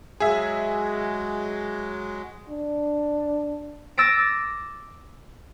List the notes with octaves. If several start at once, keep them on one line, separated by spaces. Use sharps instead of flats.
F#3 G#3 G#4 E5
D4
D6 E6 A6 A#6 D7